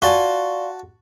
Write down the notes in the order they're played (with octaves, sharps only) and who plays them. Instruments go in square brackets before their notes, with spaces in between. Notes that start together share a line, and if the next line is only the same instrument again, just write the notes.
[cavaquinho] F4 G#5 [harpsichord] F#4 A5 [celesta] D5 G7